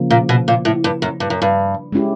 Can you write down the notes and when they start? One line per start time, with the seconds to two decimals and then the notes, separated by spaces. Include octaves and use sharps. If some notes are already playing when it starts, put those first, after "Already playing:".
Already playing: C#3 F3 A#3
0.10 A#2
0.29 B2
0.48 A#2
0.65 A2
0.84 G2
1.02 F#2
1.20 G2
1.30 F#2
1.42 G2
1.92 G#3 C#4 E4 G4